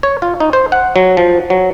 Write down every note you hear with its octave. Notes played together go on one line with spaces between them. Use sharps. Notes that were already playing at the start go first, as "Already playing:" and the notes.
C#5
F4
D#4
C5
F#5
F#3
F3
F#3